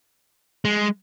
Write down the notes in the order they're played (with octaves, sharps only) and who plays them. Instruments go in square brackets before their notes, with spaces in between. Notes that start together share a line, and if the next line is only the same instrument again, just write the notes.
[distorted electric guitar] G#3